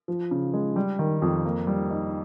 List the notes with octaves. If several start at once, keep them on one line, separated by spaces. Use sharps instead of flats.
F3
C#3
G#3
G3
D#3
F2
A#3
G3
D#4